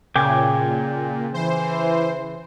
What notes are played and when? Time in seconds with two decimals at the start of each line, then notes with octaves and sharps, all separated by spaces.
0.16 A#2 C#3 G5 G#5 D6
1.34 E3 C5